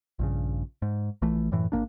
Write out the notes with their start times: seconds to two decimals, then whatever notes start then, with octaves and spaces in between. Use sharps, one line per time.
0.19 A#1 G2 C#3
0.82 G#2
1.22 A#1 E3 A3
1.52 F#2 A2 E3
1.72 G#1 F#2 A#3 D4